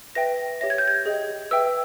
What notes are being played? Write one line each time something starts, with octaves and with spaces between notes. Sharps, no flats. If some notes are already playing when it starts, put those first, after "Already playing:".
B4 E5 G5 A#6
G4 C#5 E5 A#6
G#6
G6
G#6
G#4 D#5 G5
B4 E5 G5 E6